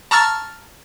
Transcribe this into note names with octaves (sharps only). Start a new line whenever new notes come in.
A5 A#5 C#6 E6 F6 A6